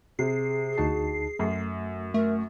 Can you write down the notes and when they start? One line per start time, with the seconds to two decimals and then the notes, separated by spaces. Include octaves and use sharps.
0.19 C3 G#4 C7
0.78 D2 D#4 F#4 A5
1.39 F#2 A3
2.14 A3 A#4